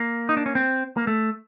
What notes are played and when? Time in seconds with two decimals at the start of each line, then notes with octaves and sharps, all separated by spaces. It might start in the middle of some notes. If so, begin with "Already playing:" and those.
Already playing: A#3
0.29 D#4
0.37 D4
0.46 C#4
0.55 C4
0.97 A#3
1.07 A3